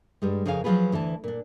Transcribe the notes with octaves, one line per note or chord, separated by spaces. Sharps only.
G2 G3 G#3
F2 C#3 G#4 A#4 F5 G#5
F3 F#3 B3 F4 G#4 B4
D2 E3 E4 A5
A#2 D4